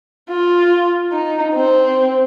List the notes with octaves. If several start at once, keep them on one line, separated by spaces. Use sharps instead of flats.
F4
D#4
C4